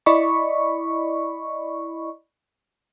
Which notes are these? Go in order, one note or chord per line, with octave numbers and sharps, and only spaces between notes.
E4 D5 D#5 B5 C#6